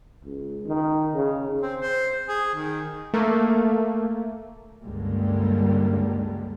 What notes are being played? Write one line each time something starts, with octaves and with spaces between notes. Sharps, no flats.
C#2
D#3
C#3
C4
C5
G#4
D#3
A3 A#3
C#2 G2 D3 G3 G#3 A#3